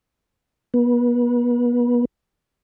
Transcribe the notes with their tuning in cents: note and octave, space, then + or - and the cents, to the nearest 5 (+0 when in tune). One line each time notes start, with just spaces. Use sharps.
B3 -35